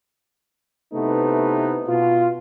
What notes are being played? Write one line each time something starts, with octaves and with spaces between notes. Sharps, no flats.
C3 A3 B3 D#4 E4 B4
B2 F4